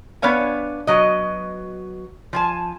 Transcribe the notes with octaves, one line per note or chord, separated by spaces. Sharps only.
B3 D4 C#5 F5 G#5
B2 F#3 D#5
F3 G#5 A5